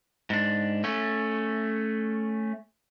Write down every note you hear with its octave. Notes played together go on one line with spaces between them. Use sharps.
G#2 D4
A3 C#4